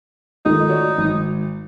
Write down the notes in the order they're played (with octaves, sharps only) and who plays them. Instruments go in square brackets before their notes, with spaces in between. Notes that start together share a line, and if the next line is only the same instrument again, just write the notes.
[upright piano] C#2 D#3 A3 [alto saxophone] D#4
[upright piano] F#4 C#5 D5
G#1